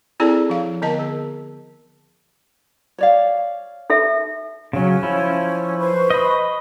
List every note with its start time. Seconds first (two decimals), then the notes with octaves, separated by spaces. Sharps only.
0.20 C4 E4 G#4 A4 D5 A5
0.50 F3 F5
0.82 D3 B3 A#4 D#5 A5
0.99 G#4
2.98 C#5 D5 F5
3.90 D#4 A4 E5
4.73 C#3 F#3 C#4
5.03 F3 E4
5.79 B4 C5 C#6
6.10 D#5 B5